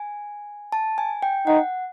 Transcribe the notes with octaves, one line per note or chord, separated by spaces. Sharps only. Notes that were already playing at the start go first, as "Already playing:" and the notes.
Already playing: G#5
A5
G#5
G5
D#4 F#5